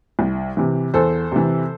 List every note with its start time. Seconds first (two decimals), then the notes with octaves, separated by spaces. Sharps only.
0.19 C2
0.57 C3 E3
0.94 E2 A4 C5
1.32 C3 E3